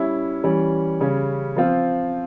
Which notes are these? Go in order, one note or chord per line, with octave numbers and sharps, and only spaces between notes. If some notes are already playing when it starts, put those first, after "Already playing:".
Already playing: G3 C#4 E4
E3 G3 C#4
C#3 G3 C#4
F3 C4 F4